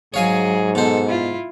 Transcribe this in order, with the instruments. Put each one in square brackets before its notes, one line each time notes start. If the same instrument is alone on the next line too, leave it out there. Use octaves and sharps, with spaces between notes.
[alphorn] G#2 [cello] F#3 G#4 [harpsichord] C#5 F5 G#5
[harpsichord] B2 C5 [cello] A4
[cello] E4 F4